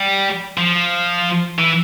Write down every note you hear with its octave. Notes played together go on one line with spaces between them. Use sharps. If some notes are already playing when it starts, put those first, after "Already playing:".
Already playing: G3
F3
E3